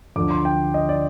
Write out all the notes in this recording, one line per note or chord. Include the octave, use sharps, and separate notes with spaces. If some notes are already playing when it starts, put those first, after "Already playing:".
D2 D3 F3 D6
C6
G5
D#5
D5